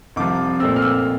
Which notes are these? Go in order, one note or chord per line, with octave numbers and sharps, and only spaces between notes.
C2 C3 F3 D6
A#2 A3 C4 E6
F6
E6